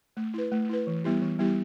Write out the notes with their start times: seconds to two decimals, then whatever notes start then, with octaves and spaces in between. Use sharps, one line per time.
0.17 A3
0.34 E4 B4
0.52 A3
0.69 E4 B4
0.87 E3
1.04 G3 B3 E4 G4
1.22 E3
1.39 G3 B3 E4 G4